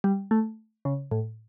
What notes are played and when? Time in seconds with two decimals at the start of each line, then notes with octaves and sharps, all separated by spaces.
0.04 G3
0.31 A3
0.85 C#3
1.11 A2